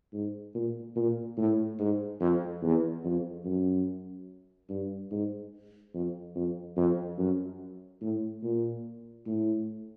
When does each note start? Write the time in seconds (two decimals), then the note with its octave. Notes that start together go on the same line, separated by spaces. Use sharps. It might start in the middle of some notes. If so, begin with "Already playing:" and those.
0.13 G#2
0.55 A#2
0.96 A#2
1.38 A2
1.79 G#2
2.20 F2
2.62 E2
3.04 F2
3.45 F#2
4.69 G2
5.11 G#2
5.94 F2
6.35 F2
6.77 F2
7.18 F#2
8.01 A2
8.43 A#2
9.26 A2